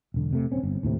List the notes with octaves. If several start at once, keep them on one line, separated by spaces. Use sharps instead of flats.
E1 D3
C3 A3
D#1 C4 C#4
G1
D#2 A2 C3